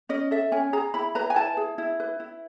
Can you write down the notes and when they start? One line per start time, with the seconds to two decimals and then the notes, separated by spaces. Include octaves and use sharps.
0.09 C#4 D#5
0.31 A4 E5
0.52 C#4 G#5
0.73 G#4 A#5
0.94 E4 B5
1.15 B4 A#5
1.30 G#5
1.36 E4 A5
1.57 G#4
1.78 E4
2.00 B4
2.20 E4